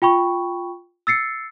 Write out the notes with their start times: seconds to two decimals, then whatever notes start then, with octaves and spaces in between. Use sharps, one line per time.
0.02 F4 G5 B5 C#6
1.07 E6 A6 C7 C#7